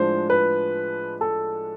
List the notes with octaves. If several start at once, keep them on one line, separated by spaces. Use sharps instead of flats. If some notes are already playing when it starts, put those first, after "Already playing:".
Already playing: A2 F3 G#3 D4 C5
B4
A4